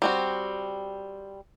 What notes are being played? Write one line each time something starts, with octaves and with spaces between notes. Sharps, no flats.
G3 C4 F#4